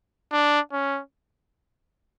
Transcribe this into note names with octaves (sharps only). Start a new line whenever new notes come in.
D4
C#4